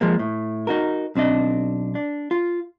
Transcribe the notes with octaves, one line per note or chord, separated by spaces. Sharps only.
F3 G#3 A#3
A2
D#4 F#4 A#4
B1 C4 D4 D#5
D4
F4